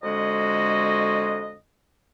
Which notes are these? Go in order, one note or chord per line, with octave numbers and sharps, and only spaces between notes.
F2 D3 G#3 F#4 D#5